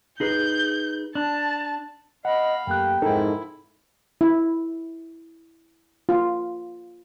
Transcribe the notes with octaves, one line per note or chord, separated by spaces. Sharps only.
D#4 G#4 B4 G6
D4 A5
D#5 F5 F#5 B5
F#2 A3 A#3 G4 G5 F#6
F2 G#2 D#4 E4 A4 A#4
E4
F4